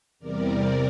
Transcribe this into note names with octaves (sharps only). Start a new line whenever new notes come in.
E2 C3 G3 A#4 D5
C3